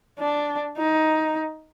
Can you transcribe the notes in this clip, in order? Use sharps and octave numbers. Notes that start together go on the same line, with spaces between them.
D4
D#4